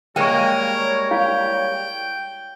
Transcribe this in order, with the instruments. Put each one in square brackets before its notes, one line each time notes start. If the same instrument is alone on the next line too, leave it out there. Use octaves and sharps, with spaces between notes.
[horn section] G3 C#5 [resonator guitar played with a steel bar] G#3 A#3 [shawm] A#4 [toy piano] G5 C#6
[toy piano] E4 F5 [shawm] G5